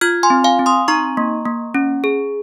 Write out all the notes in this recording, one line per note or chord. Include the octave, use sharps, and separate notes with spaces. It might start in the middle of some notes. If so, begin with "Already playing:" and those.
F4 F6 G#6
G#5 C6
C4
F5 G#5
C4
C6 D#6
D#4 A#5 C#6
A#3
A#3
C#4
G#4